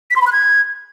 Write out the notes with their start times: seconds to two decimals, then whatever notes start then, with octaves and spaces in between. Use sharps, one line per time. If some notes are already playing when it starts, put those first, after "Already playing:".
0.10 B6
0.16 C6
0.21 B5
0.27 F#6
0.32 G#6